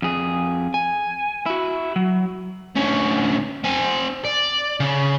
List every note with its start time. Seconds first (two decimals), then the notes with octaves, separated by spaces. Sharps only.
0.02 F2 G#4
0.74 G#5
1.46 E4 F#4
1.96 F#3
2.76 D2 C#4
3.64 C4 G#5
4.25 D5
4.80 C#3